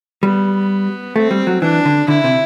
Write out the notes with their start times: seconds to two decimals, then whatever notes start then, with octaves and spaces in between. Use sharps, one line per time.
0.23 G3 B3
1.16 A3 C4
1.31 G3
1.47 F#3
1.62 E3 D4
1.85 D3
2.08 D3 E4
2.24 C3